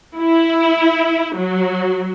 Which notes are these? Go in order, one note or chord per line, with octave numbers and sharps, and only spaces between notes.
E4
F#3